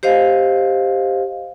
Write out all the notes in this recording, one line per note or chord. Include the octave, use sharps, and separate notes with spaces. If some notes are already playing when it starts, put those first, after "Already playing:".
G4 C5 D#5 F5